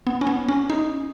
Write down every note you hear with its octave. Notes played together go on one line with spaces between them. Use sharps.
B3
C#4
B3
C#4
D#4